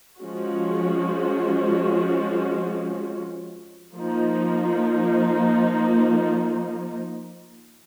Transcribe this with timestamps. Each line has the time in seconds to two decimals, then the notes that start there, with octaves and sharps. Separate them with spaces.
0.20 F3 G#3 C#4 F#4
3.95 F3 A#3 D#4